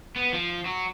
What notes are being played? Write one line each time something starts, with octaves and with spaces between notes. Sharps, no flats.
B3
F3
F#3